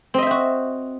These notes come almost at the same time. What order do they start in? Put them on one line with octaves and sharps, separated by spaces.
C4 D#5 E5 C5 F#4